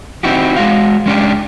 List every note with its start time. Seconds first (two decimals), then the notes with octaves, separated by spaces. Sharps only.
0.23 C4 D#4 E4 F#4 G4
0.56 G#3 F#4 F5
1.06 G#3 C#4 D4 G4